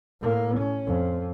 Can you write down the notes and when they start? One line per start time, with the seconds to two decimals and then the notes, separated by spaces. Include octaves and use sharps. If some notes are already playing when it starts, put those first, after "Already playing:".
0.21 A2 A#3
0.58 C#4
0.87 F2